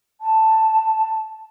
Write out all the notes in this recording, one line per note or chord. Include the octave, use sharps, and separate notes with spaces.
A5